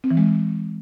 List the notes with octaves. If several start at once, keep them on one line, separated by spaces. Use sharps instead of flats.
C4
E3
G#3